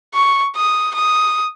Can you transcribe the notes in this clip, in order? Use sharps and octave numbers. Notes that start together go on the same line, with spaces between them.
C#6
D#6
D#6